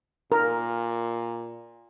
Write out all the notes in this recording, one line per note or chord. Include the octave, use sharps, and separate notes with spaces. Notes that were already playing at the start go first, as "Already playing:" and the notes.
A#2 A#4